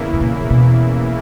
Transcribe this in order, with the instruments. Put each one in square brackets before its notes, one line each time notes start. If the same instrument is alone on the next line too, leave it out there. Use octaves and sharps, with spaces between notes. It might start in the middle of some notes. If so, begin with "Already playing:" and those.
Already playing: [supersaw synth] E2 C#3 E3 A#3 E4
[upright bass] G2
A#2
A#2
B2